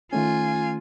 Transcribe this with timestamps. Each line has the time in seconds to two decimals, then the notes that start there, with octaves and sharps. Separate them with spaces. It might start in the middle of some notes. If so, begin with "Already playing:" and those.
0.13 D#3 A3 C#4 F4 G#5